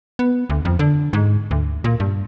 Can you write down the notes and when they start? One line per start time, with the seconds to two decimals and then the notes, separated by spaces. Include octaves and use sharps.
0.19 B3
0.49 D2
0.65 F2
0.79 D3
1.13 G#2
1.51 D2
1.84 A#2
2.00 G2